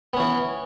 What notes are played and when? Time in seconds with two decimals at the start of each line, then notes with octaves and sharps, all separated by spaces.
0.13 B3
0.17 C#4
0.20 E3